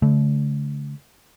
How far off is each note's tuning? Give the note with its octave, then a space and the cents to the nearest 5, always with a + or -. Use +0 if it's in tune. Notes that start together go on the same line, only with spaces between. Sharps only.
D3 -45 A3 -30